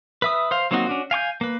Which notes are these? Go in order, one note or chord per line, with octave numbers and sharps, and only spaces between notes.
B4 E5 D#6
C5 F5
F#3 A#3 C4 D#4 F#4
C#4 D4 F#4
F5 G#5 C#6 G6
A#3 B4